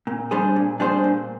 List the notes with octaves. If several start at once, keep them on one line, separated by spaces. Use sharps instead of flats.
A#2
G3 D4 G#4 C5
A#2
G3 D4 G#4 C5
A#2